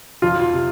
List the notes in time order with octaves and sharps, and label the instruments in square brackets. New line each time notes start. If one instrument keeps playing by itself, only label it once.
[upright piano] F2 [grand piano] F4
[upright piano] C3